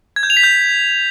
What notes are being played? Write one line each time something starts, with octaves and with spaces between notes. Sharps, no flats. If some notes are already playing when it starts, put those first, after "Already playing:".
G#6
G6
F7
B6
G6